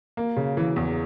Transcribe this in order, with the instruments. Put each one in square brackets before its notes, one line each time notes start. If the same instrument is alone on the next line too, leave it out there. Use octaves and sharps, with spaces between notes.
[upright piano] A#3
C#3
E3
E2